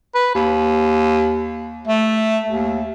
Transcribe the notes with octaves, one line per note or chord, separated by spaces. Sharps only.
B4
D#2
A3
D#2